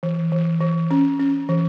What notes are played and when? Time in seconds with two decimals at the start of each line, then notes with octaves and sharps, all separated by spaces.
0.03 E3
0.32 E3
0.61 E3
0.91 C#4
1.19 C#4
1.49 E3